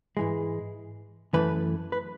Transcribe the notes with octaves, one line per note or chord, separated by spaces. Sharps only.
G#2 E3 G#3
F#2 E3 A3 B4
B4